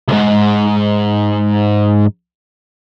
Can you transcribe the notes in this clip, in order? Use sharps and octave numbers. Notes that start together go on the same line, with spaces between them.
C#2 G#2